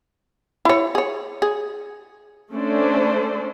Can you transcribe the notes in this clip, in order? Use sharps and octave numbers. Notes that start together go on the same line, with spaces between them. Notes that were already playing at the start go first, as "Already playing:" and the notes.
E4 C#5
G#4 C#5
G#4
A3 C#4 D4 A4 C5 D5